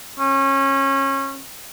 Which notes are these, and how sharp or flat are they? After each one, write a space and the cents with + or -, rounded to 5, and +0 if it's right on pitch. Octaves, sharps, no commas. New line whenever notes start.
C#4 -25